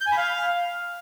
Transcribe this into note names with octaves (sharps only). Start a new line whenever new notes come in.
G6
G#5
B5
F5